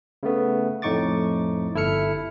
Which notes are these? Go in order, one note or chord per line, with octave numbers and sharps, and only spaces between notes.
C#3 A3 B3
F2 A2 D#4 C#6 D6 A6
G1 E4 A4 F6 C#7